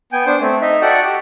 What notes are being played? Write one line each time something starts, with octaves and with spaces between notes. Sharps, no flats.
B3 G5 G#5
D4 C5
A3 C4
D#4 D#5 E5
F#4 A4 D5 E5 F#5 G5
F#4 G4